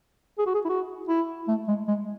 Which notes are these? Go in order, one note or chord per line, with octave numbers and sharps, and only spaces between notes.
G#4
F#4
G#4
E4
F#4
E4
A3
G#3
G#3